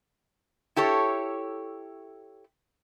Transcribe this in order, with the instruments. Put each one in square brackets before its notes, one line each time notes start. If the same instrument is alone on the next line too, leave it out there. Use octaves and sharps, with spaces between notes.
[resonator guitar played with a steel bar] E4 G4 A4 C#5